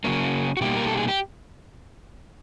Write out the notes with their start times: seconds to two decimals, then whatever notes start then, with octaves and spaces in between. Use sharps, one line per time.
0.04 C#3 F#3 A#3 C#4
0.57 F#4
0.61 B2 G3 A#3 D#4 G4
0.77 A#4
0.87 A4
0.97 G#4
1.08 G4